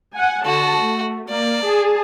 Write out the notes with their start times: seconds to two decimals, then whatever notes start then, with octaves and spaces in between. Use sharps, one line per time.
0.14 F#5 G#5
0.45 D3 F#4 A5
0.77 A3
1.29 A#3 D5
1.65 G#4 A5